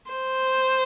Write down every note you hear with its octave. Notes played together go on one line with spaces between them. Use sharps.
C5